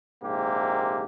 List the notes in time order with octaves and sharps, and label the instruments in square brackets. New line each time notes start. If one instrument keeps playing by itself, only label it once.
[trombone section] A#1 G#2 C3 A#3 G4